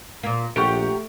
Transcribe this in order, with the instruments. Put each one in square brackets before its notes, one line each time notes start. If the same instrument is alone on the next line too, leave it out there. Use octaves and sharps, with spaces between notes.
[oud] A#2 A#3
[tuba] A#1 [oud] A3 [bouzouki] G4 A#4 F#5 [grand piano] C#6 D7